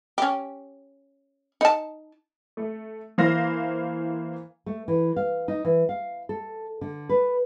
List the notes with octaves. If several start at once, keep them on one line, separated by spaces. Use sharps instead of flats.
C#4 G4
D#4 A5
A3
E3 A#3 C5 F5 A#6
A3
E3
F5
D#4
E3
F5
A4
D3
B4